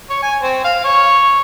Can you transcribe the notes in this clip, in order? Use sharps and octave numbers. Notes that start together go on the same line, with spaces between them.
C#5
G#5
C4
F5
C#5